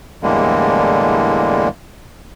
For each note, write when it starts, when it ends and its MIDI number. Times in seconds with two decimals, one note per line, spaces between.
0.23 1.68 40
0.23 1.68 45
0.23 1.68 50
0.23 1.68 55
0.23 1.68 56
0.23 1.68 58